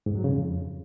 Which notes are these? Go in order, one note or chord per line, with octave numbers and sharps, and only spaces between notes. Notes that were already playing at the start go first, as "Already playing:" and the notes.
G#2
F#3
C#3
F2